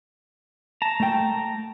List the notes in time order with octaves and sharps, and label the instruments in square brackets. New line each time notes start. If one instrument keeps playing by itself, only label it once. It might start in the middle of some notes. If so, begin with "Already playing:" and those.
[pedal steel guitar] A5 A#5
[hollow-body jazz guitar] A3 G5